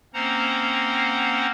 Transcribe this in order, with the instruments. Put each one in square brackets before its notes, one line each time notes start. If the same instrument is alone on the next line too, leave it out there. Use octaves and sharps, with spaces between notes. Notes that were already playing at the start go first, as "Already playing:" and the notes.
[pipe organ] A#3 C4 C#4 C5 F#5 A#5